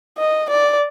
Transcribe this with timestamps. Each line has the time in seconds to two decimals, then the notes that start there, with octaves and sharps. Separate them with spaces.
0.18 D#5
0.50 D5